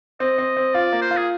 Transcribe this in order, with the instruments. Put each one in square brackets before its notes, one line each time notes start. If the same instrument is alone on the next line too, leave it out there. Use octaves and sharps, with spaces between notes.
[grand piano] C4 [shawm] D#5
[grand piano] C4
C4
[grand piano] F4 [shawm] D5
[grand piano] A#3
[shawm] C5
[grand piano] F4
[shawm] G#4